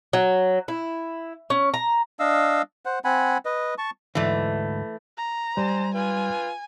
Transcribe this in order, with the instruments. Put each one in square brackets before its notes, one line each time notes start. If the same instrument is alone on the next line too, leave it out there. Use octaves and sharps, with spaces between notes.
[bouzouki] F#3
E4
C#4
A#5
[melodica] D4 D#5 F5 E6
C5 F#5
C4 F#5 G#5 B5
B4 D#5
A5 C#6
[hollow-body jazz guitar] D2 G#2 [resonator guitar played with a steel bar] E3 A3
[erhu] A#5
[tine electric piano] G3 [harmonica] C5 G#5
[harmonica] F4 B4 [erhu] G#5